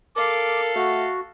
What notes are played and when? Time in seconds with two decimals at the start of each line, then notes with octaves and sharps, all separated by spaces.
0.16 A4 A#4 F5 D6
0.76 A3 F#4